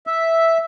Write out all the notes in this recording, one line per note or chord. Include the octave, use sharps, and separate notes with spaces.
E5